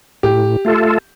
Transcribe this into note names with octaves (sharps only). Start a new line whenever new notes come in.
A2 G4
A3 F4 A4